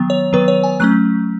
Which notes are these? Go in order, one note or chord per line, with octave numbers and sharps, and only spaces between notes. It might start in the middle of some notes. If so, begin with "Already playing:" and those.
Already playing: D#3 F#3 B3
C#5
D#3 F#3 B3 B4
C#5
G#5
F#3 A3 C#4 F#6